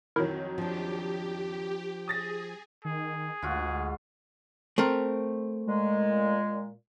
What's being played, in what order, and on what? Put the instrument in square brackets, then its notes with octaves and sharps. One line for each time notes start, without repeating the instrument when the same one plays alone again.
[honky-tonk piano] F2 D#3 F#3 [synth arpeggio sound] E4 A#4
[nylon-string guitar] F3 D4 [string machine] G4
[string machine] G#4 [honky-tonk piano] D#6 A6 A#6
[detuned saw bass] D#3 [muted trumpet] G#4
[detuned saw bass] D2 [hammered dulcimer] G#2 F4 F#4
[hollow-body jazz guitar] A3 C4 A#4
[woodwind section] A#2 G#3